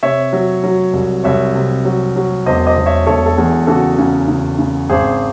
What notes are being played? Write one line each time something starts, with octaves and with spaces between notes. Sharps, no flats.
C3 C#5 E5
F#3
F#3
C2
C2 C#5 E5
C3
F#3
F#3
E1 C5 D#5
C5 D#5
E1
C#5 E5
E1 A4 C#5
A4
E2 G#4
C#3 F#4 A4
C#3
C#3
C#3
G#1 G#4 C5